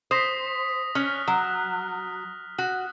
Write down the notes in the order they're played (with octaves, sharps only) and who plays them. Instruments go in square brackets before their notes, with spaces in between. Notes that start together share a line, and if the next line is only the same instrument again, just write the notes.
[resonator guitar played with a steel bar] C5 [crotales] D#6 A#6 B6
[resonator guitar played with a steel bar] C#4 [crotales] F6 F#6
[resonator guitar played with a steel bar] F#3
F#4